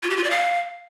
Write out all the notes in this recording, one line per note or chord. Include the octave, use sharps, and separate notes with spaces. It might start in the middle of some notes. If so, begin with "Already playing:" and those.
F4
G4
F4
D5
F5